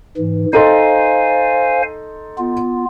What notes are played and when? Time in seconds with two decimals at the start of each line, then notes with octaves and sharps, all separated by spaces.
0.17 G#2 E3
0.53 D#4 A4 C5 F5 G#5 C6
2.38 B3 F4